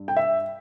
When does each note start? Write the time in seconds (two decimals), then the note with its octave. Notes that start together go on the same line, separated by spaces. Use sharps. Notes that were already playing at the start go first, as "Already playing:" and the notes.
Already playing: G2
0.08 G5
0.17 E5